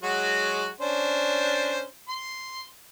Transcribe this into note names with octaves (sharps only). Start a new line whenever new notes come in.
F#3 G#3 F#4
C#4 D4 C5
C6